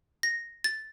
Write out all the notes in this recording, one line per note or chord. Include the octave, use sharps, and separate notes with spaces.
A#6
A6